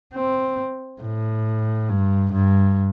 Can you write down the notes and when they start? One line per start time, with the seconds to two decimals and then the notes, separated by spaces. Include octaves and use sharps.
0.14 C4
1.01 A2
1.89 G2
2.33 G2